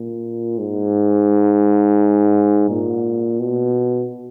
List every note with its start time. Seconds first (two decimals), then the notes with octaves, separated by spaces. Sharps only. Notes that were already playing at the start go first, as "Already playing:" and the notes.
Already playing: A#2
0.58 G#2
2.69 A#2
3.40 B2